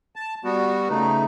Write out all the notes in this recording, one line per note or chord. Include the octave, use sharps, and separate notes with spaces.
A5
G3 B3 F#4
C#3 A3 D#4